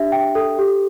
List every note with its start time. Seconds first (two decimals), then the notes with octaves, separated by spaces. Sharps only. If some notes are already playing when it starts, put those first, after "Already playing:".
Already playing: D4 G4 E5
0.12 G5
0.35 A4
0.59 G4